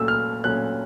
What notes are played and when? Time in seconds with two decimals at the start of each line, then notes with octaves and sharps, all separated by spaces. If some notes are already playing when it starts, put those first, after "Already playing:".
Already playing: A#2 F#3 A3 C#4 E6
0.08 F6
0.44 A#2 F#3 A3 C#4 F#6